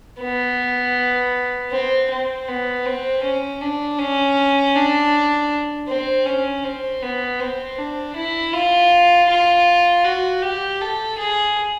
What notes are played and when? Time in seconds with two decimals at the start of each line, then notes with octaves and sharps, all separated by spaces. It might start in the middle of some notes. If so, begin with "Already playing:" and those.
0.21 B3
1.72 C4
2.10 C4
2.48 B3
2.86 C4
3.24 C#4
3.62 D4
4.00 C#4
4.75 D4
5.89 C4
6.26 C#4
6.64 C4
7.03 B3
7.40 C4
7.78 D4
8.16 E4
8.53 F4
9.29 F4
10.05 F#4
10.43 G4
10.81 A4
11.19 G#4